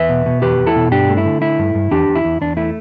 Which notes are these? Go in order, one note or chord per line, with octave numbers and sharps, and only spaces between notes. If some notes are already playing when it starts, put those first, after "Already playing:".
Already playing: E2 B4 E5
B2
B2
E2 G4 B4
E2
E4 A4
B2
G2 D4 G4
A3
E4
D3
A3 E4
G2
G2
E2 D4 G4
E2
E4
E2
E2 D4
A3 E4